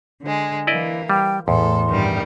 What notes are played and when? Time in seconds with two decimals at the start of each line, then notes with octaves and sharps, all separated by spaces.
0.21 D3 G#3
0.67 E3 A#3 E4 D5 D#5
1.10 G3 G5
1.48 E2 A2 A4 C6
1.89 G2 D#3 G3